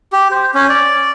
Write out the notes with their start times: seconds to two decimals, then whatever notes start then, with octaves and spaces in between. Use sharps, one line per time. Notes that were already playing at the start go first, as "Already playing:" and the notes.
0.13 G4
0.31 C5
0.54 C#4
0.69 D5